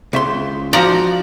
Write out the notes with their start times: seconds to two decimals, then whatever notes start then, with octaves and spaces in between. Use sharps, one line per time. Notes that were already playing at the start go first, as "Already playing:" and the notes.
0.13 C#2 E5 C6
0.73 F3 D#4 F#4 D5 A#5